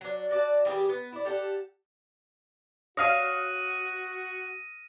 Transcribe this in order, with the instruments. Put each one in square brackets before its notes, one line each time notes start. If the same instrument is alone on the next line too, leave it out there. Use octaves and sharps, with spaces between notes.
[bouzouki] F#3 D4
F#4 D5 A5
E3 G3 G4 G#4
B3
E4 D5
G4 A4 F#5
[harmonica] F#4 F#5 [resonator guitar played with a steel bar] C#5 F5 [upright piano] D#6 F6 [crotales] A#6 D#7